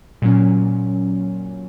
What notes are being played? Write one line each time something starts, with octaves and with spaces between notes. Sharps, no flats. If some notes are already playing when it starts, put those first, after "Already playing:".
A#2 F#3 C#4